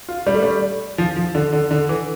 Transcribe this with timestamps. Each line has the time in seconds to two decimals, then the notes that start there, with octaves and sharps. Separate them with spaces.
0.09 F4
0.27 G3
0.35 A3
0.43 G3
0.98 F3
1.16 F3
1.35 D3
1.53 D3
1.71 D3
1.89 E3